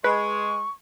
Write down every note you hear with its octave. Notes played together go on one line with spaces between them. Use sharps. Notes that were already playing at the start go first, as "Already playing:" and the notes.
G#3 B4 C#6